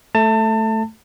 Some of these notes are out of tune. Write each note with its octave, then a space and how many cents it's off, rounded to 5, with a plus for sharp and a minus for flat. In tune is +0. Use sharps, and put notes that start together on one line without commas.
A3 +0 A5 +30